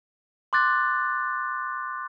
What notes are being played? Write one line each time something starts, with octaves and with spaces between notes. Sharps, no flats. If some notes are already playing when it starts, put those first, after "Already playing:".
C6 D6 F#6 A6